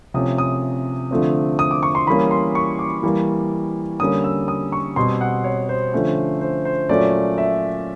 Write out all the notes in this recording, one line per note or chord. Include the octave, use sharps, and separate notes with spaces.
C3 F3 A3 C#4 D#6
D#6
D3 F3 A3 C4
D#6
D6
C#6
C6
E3 G3 A#3 C#4 B5
C6
C#6
D6
E3 G3 A#3
D3 G3 A#3 C#4 D#6
E6
D#6
C#6
B2 G3 C4 C6
F#5
C#5
C5
D3 F3 A3 C#4
C5
C5
A#2 F#3 A3 C#4 D5
E5